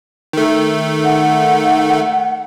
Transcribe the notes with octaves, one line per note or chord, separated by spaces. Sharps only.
D#3 A3
F#5